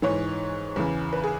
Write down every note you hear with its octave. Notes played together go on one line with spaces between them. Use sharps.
G#2 E3 C#5
E2 C#3 E3
B4
G#4